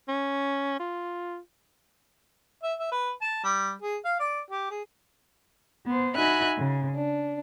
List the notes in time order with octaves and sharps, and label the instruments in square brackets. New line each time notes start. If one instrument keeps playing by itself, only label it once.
[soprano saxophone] C#4
F4
[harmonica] E5
E5
B4
A5
G3
G#4
F5
D5
G4
G#4
[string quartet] B3 C5
D#4 F#4 E5 G#5 B5 F#6
C#3
D4